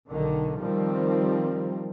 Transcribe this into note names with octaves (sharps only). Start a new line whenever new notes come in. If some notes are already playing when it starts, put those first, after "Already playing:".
B1 D3 D#3
D#3 F3 G3 C4